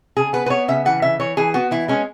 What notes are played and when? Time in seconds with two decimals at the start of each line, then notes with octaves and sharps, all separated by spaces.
0.17 C#3 G#4
0.33 B3 B4
0.46 B4
0.50 B3 C#5
0.68 C#3 E5
0.85 E3 F#5
1.02 C#3 E5
1.20 E3 C#5
1.37 E3 G#4
1.54 B3 F#4
1.71 E3 E4
1.88 G#3 C#4